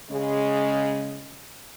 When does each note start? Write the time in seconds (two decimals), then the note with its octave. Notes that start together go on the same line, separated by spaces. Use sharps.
0.10 C#3 G#3